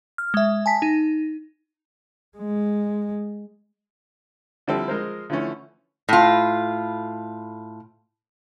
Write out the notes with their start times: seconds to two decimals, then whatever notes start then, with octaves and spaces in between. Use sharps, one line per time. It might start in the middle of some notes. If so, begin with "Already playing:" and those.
0.18 F6
0.34 G#3 E5
0.66 G#5 A5 B6
0.82 D#4
2.37 G#3
4.67 D3 F3 G3 C4 E4 A4
4.88 F3 G#3 A#4 C5
5.30 D3 E3 F3 A3 C#4
6.09 A2 F4